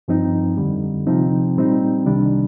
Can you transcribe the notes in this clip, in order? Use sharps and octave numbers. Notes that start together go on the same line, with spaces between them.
G2 F3 C4 D#4
F2 D3 G3
C3 F3 C4 D#4
A#2 G3 C4 D#4
C2 C3 D#3 G3 D4